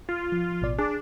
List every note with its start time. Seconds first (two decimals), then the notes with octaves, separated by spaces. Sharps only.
0.09 F4
0.32 F3
0.62 A1 B2 D5
0.78 D4 G#4